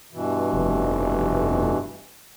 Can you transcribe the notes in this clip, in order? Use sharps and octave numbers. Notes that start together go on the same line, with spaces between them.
G2 B2 E3
F1